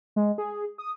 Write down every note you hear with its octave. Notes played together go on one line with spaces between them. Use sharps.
G#3
G#4
D#6